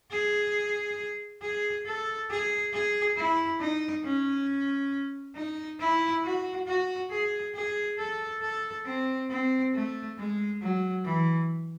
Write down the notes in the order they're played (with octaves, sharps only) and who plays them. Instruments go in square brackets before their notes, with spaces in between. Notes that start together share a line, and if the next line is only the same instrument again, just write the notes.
[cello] G#4
G#4
A4
G#4
G#4
E4
D#4
C#4
D#4
E4
F#4
F#4
G#4
G#4
A4
A4
C4
C4
A3
G#3
F#3
E3